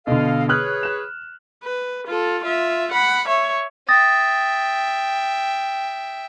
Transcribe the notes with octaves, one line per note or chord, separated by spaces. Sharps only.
B2 D3 A4 D#5 F5
G#4 B4 C#5 D#6 F6 F#6
F#6 E7
B4
F4 A4
F4 E5
F#5 B5
C#5 E5
E5 G5 D#6 A6 A#6